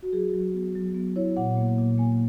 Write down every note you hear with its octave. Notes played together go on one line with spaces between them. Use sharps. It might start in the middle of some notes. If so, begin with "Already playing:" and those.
F#4
F#3 G#4
F#3
B3
F#3
B3
E4 C#5
A#2 F#5
A#3
A#2
A#3 G#5